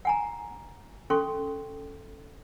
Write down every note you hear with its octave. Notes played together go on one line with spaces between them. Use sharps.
F#5 G#5 A#5
C#4 A4 C6 C#6